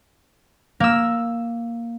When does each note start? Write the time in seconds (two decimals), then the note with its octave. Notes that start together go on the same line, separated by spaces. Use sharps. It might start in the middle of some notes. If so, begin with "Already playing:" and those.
0.80 A#3 E6